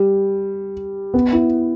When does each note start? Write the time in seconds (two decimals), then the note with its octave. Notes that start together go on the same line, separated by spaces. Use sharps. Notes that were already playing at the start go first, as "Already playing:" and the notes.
Already playing: G3
1.14 B3
1.33 E4